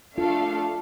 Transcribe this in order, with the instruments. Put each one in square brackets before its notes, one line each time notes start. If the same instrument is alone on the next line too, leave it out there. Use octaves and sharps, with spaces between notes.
[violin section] A3 D4 A4 F5 [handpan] F4